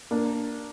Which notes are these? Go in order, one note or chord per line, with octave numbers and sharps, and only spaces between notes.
A#3 D4